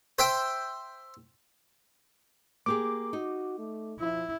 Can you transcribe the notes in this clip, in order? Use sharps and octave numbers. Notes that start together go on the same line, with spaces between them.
C5 E5 G5
A#3 G4 G#4 D6
D#4 F#4
A3
F3 E4